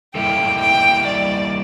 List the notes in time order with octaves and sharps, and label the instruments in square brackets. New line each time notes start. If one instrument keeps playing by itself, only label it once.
[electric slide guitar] G3 A#3 E4 A4 [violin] G5
[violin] G5
D5